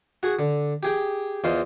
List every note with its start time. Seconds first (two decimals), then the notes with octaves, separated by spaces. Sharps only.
0.23 F#4 G#4
0.39 D3
0.83 G4 G#4 G5
1.44 E2 F4 C5 D#5 C6